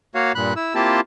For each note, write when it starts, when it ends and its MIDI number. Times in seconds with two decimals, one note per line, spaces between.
0.15 0.32 58
0.15 0.32 66
0.15 0.32 73
0.15 0.32 77
0.35 0.53 43
0.35 0.53 46
0.35 0.53 83
0.35 0.53 90
0.56 0.75 64
0.56 0.75 88
0.75 1.01 58
0.75 1.01 60
0.75 1.01 64
0.75 1.01 65
0.75 1.01 67
0.75 1.01 81